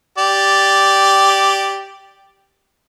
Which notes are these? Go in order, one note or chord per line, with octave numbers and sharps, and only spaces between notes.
G4 D5